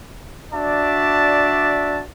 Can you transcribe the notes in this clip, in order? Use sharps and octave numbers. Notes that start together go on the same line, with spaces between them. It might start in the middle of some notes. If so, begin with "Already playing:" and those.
D4 F#4 D5 E5 A5